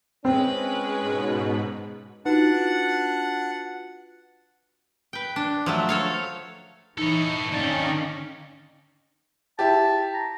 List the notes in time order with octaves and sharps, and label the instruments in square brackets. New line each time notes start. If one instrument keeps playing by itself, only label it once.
[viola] G#3 B4 [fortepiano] C4 [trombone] C#4
[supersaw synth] G#2 B2
[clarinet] D4 [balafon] D#4 [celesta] F4 F#4 B4 [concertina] F#5
[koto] B4 G5
D4
F3 F#3 A3
A4 C#5 F5
[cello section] E3 [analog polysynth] D#4 [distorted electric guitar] A4 C#5
[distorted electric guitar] D#3 A4 [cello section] C#4 D#4 [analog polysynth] D5 F5 G5
[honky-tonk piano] E4 G4 [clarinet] A5
[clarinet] A#5